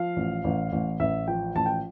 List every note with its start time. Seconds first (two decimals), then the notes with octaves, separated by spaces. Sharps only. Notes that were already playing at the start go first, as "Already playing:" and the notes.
Already playing: F3 F5
0.16 A1
0.44 A1
0.72 A1
1.00 A1 E5
1.28 F3 G5
1.55 A1 A5
1.66 G5